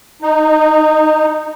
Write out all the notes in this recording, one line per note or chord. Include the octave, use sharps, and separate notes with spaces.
D#4